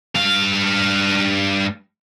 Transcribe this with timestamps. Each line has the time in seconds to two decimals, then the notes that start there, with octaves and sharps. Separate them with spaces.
0.15 G2 F5